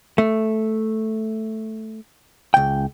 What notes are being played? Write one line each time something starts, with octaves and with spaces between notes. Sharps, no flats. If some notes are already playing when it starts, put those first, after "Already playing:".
A3
C#2 G5